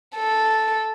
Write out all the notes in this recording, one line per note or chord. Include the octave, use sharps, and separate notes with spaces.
A4